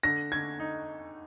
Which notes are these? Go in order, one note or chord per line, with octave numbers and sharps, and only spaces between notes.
D3 A#6
D3 G#6
D#4